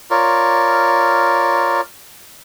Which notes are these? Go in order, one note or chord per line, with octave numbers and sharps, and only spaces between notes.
F4 A#4 C#5 D5